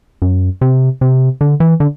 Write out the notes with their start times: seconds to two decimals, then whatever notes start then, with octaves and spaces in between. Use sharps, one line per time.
0.22 F#2
0.61 C3
1.01 C3
1.41 D3
1.60 E3
1.80 D3